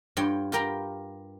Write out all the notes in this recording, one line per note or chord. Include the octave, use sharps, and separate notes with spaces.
G2 F4 C#5 G5
F4 G4 A#4 G5 A#5 B5